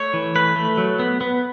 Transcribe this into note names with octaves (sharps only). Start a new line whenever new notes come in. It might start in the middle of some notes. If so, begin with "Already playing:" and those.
Already playing: A3 C#5
E3
A3 B4
A3
F#3
B3
B3